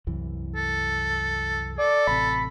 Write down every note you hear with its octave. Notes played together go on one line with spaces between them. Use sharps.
C2 F#2 E3
A4
A4 D5
A1 C3 B5